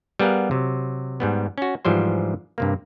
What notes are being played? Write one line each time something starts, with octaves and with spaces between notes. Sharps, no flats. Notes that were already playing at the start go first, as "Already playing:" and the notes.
G3 B3 G#4 A#4 F5 F#5
C3 F#3
G#2 G3 B3
C#4 F#4
G#2 E3 F3 G3 C5
G2 C3 A#3